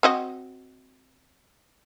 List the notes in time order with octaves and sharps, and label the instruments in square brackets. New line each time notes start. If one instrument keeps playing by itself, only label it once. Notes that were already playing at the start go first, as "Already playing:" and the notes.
[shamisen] C4 F#4 D#5